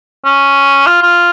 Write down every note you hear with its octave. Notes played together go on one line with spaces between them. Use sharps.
C#4
F4
F4